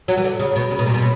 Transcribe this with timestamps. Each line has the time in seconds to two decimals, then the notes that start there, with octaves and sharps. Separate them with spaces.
0.08 F#3
0.17 E3
0.24 D3
0.39 C#3
0.56 B2
0.71 C#3
0.79 B2
0.86 A#2
0.94 B2